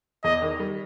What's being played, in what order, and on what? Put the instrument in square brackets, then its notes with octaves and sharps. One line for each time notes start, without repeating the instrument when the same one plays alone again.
[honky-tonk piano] E2 [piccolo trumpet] D#5
[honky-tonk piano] D#3
G3